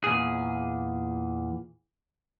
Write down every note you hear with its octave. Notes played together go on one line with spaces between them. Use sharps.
E2 A#2 G#4